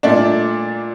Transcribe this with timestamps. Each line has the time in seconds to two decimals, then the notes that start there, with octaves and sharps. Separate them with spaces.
0.03 A#2 A3 D4 D5